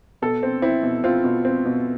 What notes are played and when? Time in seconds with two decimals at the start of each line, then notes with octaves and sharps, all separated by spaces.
0.22 B2 A4
0.43 C4
0.62 C4 E4
0.83 B2
1.04 C4 F4
1.24 B2
1.45 C4
1.65 B2